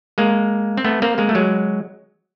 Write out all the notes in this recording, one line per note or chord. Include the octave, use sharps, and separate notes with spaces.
G#3 A#3
C4
A3 B3
A#3 C4
G#3 A#3
A3
F#3 G#3